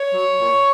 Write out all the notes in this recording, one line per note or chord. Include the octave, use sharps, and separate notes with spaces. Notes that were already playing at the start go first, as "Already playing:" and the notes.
Already playing: C#5
F#3
A#2